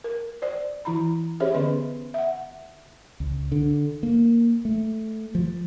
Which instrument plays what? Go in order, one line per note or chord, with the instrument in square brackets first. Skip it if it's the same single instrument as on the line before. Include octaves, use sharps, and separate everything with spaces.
[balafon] A#4
C5 D5
E3 E4 A#5 B5
C#4 G4 G#4 C5 C#5 E5
D3 B3 C#4 B4 D#5 C6
E5 F#5
[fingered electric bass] C#2
D3
A#3
A3
F3